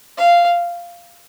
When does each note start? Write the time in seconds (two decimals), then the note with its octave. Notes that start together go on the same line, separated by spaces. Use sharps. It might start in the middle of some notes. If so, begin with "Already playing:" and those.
0.18 F5